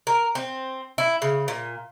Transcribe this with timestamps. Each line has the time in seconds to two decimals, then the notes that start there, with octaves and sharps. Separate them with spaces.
0.07 A#4
0.35 C4
0.98 E4
1.22 C#3
1.48 A#2